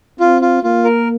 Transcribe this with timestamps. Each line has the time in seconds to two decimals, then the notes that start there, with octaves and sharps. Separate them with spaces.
0.20 C4 F4
0.42 F4
0.63 A#3 F4
0.85 A#4